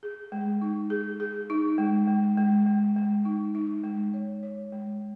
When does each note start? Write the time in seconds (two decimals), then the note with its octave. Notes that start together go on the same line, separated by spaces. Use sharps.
0.03 G#4
0.32 G#3
0.61 D#4
0.90 G#4
1.20 G#4
1.50 D#4
1.78 G#3
2.08 G#3
2.38 G#3
2.67 G#3
2.96 G#3
3.25 D#4
3.55 D#4
3.84 G#3
4.14 C#5
4.43 C#5
4.72 G#3